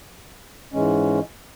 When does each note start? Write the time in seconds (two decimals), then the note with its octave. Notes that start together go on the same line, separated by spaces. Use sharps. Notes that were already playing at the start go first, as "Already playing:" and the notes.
0.73 G#2 E3 G#3 C#4